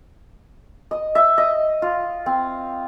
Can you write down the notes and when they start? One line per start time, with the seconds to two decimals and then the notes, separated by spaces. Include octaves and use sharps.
0.91 D#5
1.15 E5
1.38 D#5
1.82 F4
2.26 C4